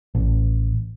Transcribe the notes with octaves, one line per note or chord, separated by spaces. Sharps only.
A1